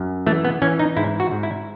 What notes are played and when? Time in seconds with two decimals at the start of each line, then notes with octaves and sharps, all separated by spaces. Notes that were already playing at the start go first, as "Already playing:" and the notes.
Already playing: F#2
0.26 E3 A3
0.45 B3
0.62 E3 C#4
0.79 D#4
0.97 G#2 E4
1.20 F#4
1.32 G#2
1.43 E4